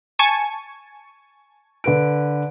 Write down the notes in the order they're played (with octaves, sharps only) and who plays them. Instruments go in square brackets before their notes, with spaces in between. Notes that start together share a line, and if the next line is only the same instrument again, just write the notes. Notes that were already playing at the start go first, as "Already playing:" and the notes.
[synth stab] G#5 A5 C#6
[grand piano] D3 B4 D7